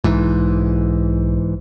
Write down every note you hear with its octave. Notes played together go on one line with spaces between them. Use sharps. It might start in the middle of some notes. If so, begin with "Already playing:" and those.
B1 G#2 E3